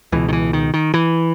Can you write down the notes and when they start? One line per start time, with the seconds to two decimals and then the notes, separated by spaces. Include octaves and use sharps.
0.12 C#2 B2 E3
0.29 D#3
0.33 E3
0.53 D#3
0.74 D#3
0.94 E3